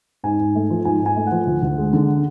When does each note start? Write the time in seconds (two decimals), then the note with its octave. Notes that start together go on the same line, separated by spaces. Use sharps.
0.24 G#2 G#5
0.40 G#2
0.55 A3
0.70 F3
0.85 G#2 G#5
1.01 G#2 G#5
1.16 A3
1.27 F#5
1.32 F3
1.47 D2
1.62 D2
1.78 G#3
1.93 D3